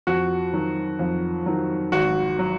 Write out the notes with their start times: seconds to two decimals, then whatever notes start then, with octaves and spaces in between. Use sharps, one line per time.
0.07 F2 F#4
0.53 D#3 F#3
0.99 F2
1.46 D#3 F#3
1.92 G#1 F#4
2.39 F#3